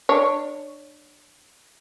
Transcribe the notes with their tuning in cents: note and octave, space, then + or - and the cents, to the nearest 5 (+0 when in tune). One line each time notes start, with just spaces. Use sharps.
D4 +25 C#5 +0